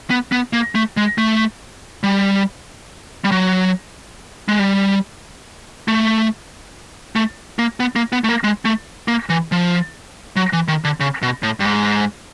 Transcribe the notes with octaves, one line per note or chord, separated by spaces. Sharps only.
B3
B3
A#3
A3
G#3
A3
G3
G3
F#3
G#3
G3
A3
A3
A#3
B3
A#3
B3
A3
A#3
G#3
A3
A#3
E3
F3
F#3
E3
D#3
D3
C#3
B2
A2
G2
G#2